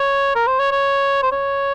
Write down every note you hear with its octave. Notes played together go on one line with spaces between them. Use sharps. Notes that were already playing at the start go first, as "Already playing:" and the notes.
Already playing: C#5
A#4
C5
C#5
C#5
C5
C#5